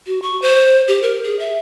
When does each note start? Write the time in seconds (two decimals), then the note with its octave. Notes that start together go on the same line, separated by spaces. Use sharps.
0.07 F#4
0.22 C#6
0.42 C5
0.88 G4
1.02 A#4
1.24 G#4
1.39 E5